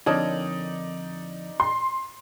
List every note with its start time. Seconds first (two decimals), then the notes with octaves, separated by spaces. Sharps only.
0.06 F2 D3 D#4 A#4 C#5 D5 A5 D#6
1.60 C6